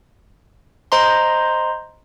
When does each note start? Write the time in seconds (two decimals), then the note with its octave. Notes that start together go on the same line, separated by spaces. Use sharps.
0.92 C5 D#5 A#5 C6